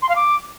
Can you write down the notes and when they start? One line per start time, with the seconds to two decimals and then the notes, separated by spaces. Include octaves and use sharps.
0.02 C6
0.09 F5
0.16 D6